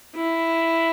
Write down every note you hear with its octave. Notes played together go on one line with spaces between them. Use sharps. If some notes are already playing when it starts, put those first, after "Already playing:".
E4